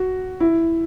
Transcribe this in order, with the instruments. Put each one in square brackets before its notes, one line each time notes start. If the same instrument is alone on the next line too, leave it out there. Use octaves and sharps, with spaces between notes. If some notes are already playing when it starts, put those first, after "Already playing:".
Already playing: [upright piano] F#4
E4